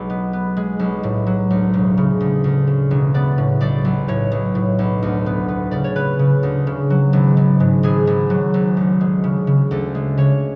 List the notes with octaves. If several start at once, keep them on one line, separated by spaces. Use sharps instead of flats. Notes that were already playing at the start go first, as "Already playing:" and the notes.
Already playing: B1 G#3
B3
B3
G#3
B1
A2
F#3
D2
E1
C#3
D2
D2
C#3
E1
B3 D5
A2
B1 D5
B1
A2 C#5
B1
A2
B1
D2
B3
B3
C#3 D5
C#5
C#3 B4
C#3
D2
C#3
F#3
G#1
G#1
G#2
G#1 G#4
G#1
F#3
G#1
D2
G#3
C#3
C#3
D2 A4
G#3
C#3 C#5